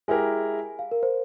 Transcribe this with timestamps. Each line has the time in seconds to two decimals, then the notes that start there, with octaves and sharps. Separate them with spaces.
0.08 G#3 E4 G4 A#4 G#5
0.79 F5
0.91 A#4
1.03 C5